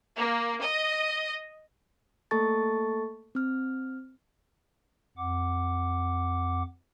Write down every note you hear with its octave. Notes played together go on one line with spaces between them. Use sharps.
A#3
D#5
A3 A#3 A4 A5 C#6 A6
C4 F6
F2 F#5 D6